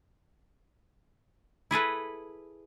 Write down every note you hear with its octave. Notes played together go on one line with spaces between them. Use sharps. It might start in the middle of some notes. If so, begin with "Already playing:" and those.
E4 G#4 A4 B4